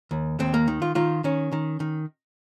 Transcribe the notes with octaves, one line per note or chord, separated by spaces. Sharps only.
D#2
D#2 C4
A#3
D#3
F4
D#3 F4
D#3 C#4
D#3
D#3